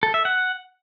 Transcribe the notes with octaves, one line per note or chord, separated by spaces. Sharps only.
A4
E5
F#5